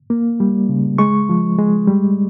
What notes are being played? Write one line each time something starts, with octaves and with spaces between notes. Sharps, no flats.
A#3
G3
C#3
G#3 C#6
F3
G#3
G3